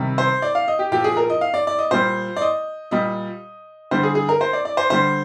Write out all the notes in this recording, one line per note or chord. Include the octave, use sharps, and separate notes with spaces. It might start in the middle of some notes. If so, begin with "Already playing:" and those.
Already playing: C3 D#3 G3
C5
D5
F5
D#5
G4
A#2 F3 G4
G#4
A#4
D#5
F5
D5
D5
D#5
A#2 G3 C5
D5
D#5
A#2 G3 D#5
D3 G3 C5
G#4
G#4
A#4
C5
D5
D5
C5
D3 G3 C5